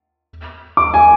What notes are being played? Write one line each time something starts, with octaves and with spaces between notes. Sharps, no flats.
D6
G#5